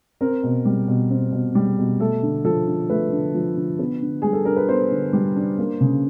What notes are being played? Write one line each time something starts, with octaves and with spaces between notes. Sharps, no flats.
C4 A#4
B2
G3
B2
C4
B2
G3
B2
A3 A4
D3
F3 A4
D3
A3 B4
D3
F3
D3
B3
D3
G3 G#4
A4
D4 A#4
B4
B3 C5
D3
G3
D4
A#3
C#3